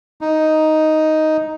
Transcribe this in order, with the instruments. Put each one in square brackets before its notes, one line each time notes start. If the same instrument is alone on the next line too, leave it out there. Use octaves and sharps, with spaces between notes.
[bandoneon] D#4